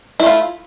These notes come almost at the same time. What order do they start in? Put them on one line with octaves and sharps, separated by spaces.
E4 A3 F4